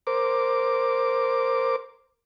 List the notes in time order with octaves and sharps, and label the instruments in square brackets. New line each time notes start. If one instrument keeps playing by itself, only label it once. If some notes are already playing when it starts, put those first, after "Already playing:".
[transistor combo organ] A#4 C5 D6